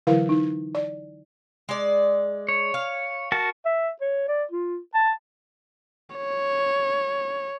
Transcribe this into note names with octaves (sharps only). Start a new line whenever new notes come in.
D3 E3 F#3 E4 A#4 F5
D#4
D5
G#3 D5
C#5
F5
F#4 A#4 A5
E5
C#5
D5
F4
A5
C#5